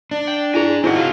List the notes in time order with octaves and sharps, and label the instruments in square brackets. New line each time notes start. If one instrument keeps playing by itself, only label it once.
[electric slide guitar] D4
[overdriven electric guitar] G5
[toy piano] E4 G#4 [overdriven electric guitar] G#5 A#5
[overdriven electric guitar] D#3 [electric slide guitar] C4 F#4 [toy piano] E4 G#4
[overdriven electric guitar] C#2 F4